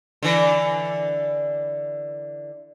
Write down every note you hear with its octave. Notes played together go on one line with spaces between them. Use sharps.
D3 E3